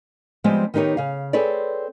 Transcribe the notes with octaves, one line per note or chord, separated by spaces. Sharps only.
F3 G3 G#3 B3 C4
D#3 B3 D#4 G4 C#5
C#3 F5
C4 G#4 A4 B4 C#5 D5